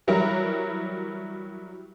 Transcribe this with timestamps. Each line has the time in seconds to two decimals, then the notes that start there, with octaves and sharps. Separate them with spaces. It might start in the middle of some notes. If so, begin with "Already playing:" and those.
0.07 E3 F#3 G3 E4 A#4